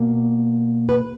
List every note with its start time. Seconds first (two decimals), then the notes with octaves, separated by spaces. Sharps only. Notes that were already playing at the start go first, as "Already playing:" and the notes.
Already playing: B2 A#3
0.89 B4